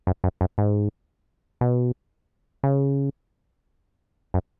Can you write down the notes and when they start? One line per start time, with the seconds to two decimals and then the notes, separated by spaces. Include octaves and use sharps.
0.07 F#2
0.24 F#2
0.41 F#2
0.58 G#2
1.61 B2
2.63 C#3
4.34 F#2